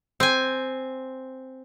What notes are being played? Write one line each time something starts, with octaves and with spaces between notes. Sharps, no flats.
C4 G#5